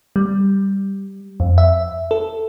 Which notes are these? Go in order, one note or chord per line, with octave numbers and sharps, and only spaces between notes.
G3
F2
E5
A4